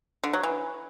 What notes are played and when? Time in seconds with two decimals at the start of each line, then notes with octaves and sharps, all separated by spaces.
0.23 D3
0.33 F#3
0.43 E3